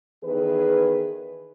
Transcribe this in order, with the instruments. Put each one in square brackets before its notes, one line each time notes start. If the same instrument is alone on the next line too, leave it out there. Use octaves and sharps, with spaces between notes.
[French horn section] E2 D#3 G#4 B4